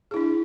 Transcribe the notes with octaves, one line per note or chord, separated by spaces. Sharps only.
D4 E4 G#4